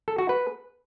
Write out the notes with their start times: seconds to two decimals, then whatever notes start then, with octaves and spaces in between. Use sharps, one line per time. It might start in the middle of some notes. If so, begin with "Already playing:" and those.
0.08 A4
0.18 F#4
0.29 B4